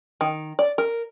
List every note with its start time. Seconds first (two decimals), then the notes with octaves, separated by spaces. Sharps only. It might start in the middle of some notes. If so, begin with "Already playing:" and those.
0.21 D#3
0.59 D5
0.78 A#4